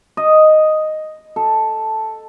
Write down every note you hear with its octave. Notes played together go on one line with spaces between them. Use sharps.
D#5
A4